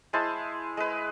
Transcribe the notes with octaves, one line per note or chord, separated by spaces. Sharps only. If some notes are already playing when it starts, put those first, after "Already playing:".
G#3 E4 C5 A5
G#3 B4